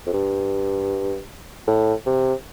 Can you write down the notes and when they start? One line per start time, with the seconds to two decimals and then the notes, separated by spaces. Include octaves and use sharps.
0.06 F2
0.14 G2
1.67 A2
2.07 C3